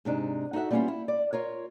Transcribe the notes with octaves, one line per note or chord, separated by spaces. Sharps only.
G#2 C3 D4 D#4
D#4 F#4 A4 E5 F#5
G3 A#3 B3 C#4 E4 F4
E4
D5
F4 A#4 C#5